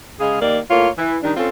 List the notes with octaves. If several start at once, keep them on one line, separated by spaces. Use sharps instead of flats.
C#3 G#3 G#4 F5
D#2 D#3 A#3 D5
A2 A#3 F4 C#5
E3
D#3 G3 D4 D#4
C4 C#4 F4 A4